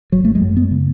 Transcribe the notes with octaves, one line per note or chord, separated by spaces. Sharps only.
G#1 F#3
A3
G#3
F#2
B3
C#3